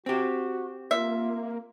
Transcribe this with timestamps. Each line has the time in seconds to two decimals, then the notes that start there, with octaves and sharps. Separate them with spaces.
0.06 C4 F#4 G4
0.91 A#3 F4 E5